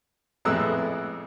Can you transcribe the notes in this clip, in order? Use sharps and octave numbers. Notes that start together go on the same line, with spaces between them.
F2 A2 G#3 B3 E6 F#6